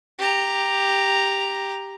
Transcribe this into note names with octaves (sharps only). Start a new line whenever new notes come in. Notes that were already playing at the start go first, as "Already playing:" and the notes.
G4 A#5